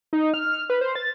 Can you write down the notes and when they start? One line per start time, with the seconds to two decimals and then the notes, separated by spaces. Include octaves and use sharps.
0.13 D#4
0.34 F6
0.54 F6
0.70 B4
0.81 C5
0.95 A6